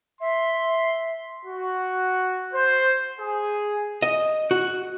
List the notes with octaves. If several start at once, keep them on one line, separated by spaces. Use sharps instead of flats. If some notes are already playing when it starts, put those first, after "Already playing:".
E5 C6
F#4
C5
G#4
D#5
F#4